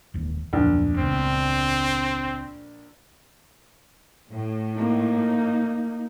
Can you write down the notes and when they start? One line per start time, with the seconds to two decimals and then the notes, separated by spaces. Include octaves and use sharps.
0.14 E1 D#2
0.53 D1 A#1 F2 B3
0.98 E1 C#2 B3 C4
4.30 A2
4.77 A#3 D#4